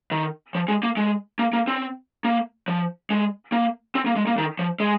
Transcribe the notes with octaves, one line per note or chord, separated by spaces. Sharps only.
D#3
F3
G#3
A#3
G#3
A#3
A#3
C4
A#3
F3
G#3
A#3
C4
A#3
G#3
A#3
D#3
F3
G#3